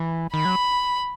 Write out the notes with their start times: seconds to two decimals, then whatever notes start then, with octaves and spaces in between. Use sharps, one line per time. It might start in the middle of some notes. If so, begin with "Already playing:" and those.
Already playing: E3
0.33 D#3 B5
0.45 F#3